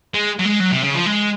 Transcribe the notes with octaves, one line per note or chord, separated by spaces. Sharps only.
G#3
F#3
G#3
F#3
C3
C#3
F3
G#3